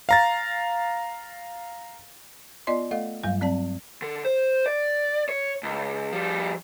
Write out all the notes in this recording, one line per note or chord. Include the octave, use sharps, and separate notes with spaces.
F5 A#5 A6
B3 F4 D5 D#5 C6
A3 A4 D#5 F5
G2 F#3 G3 F5
F#3 C4 D5 A5
D3
C5
D5
C#5
C#2
F3 G3